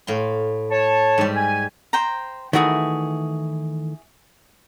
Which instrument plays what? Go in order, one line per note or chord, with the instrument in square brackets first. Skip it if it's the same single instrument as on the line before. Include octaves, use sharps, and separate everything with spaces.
[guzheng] A2 F5 C6
[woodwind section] C#5 A5
[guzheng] G#2 G3
[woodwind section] G#5
[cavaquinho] C5 G5 A#5
[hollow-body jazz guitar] D#3 E3 A3 [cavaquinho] E4 F#4 G#4